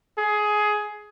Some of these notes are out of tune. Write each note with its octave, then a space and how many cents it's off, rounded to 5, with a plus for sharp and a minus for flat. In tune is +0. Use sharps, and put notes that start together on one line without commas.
G#4 +15